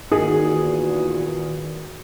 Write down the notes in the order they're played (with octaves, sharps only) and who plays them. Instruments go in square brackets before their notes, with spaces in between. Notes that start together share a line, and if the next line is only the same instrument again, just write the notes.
[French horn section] E2 A#2 F#4 [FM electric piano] D#3 [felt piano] G#4